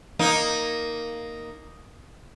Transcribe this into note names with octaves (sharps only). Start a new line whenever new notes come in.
A#3 D#4